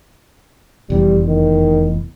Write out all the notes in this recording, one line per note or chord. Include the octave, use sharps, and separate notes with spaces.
F1 E2 G3
D#3